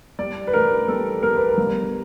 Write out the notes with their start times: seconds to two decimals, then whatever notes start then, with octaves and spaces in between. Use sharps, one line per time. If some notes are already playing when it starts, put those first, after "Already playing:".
0.19 G3 D5
0.47 B4
0.53 A1 A#4
0.88 G3 A4
1.23 G3 A#4
1.36 B4
1.49 A#4
1.58 G1